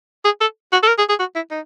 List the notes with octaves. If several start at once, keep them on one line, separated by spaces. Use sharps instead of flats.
G#4
A4
F#4
A4
A#4
G#4
G#4
F#4
E4
D#4